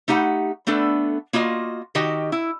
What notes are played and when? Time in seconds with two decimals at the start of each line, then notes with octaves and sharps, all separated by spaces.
0.08 A3 D#4 G4 F#5
0.67 A3 B3 D4 A4
1.33 A#3 F4 F#4 D#5
1.95 D#3 F#4 G4 D#5 G5
2.32 E4